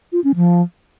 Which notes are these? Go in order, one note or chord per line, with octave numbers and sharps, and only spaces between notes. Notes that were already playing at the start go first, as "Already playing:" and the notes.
F4
C#4
F3